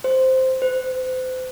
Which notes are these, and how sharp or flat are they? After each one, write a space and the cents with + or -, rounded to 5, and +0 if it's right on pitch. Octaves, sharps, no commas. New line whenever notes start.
C5 -5
C5 -35